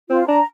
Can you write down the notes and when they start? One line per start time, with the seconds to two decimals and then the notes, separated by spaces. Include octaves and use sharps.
0.09 C4 F4
0.27 D4 A#5